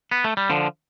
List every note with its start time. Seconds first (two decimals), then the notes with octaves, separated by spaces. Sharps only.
0.12 B3
0.24 A3
0.37 G3
0.50 D3 F3